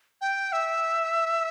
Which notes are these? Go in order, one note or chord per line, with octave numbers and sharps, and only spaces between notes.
G5
E5